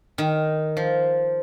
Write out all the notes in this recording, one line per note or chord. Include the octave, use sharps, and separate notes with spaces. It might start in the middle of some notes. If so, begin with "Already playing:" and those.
D#3
F3